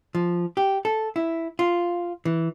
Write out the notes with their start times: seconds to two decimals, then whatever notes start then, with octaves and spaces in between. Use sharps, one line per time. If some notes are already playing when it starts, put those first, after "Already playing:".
0.15 F3
0.57 G4
0.85 A4
1.16 E4
1.59 F4
2.25 E3